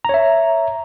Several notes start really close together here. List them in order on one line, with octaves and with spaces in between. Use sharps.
A#5 C#5 E5